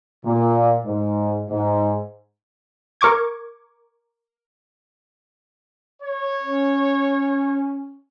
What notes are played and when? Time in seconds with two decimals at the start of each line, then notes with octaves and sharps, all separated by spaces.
0.24 A#2
0.84 G#2
1.49 G#2
3.01 A#4 C#6 D6 G#6
6.01 C#5
6.42 C#4